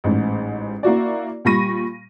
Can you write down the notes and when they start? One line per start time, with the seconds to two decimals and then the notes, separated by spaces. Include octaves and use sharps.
0.04 A1 G#2
0.83 A#3 E4 F#4 D5
1.45 A#2 G3 B5 C#6 A#6 D#7